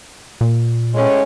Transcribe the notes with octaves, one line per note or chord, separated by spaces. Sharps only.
A#2
A2 G#3 C#4